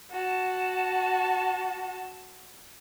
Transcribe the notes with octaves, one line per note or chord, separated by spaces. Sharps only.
F#4 A5